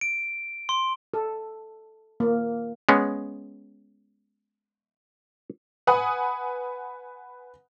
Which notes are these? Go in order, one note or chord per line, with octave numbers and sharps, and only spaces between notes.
D7
C6
A4
A#3
G#3 B3 C#4
B4 F#5 G#5 D#6